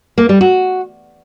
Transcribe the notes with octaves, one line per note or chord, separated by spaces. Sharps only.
A#3
G3
F#4